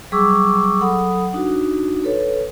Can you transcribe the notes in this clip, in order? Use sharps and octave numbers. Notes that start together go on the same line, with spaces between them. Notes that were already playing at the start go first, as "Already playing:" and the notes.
F#3 G3 G#4 C#6 D6 E6
F#3 A4 F#5 B5 D#6
D4 D#4 F#4
A4 B4 C#5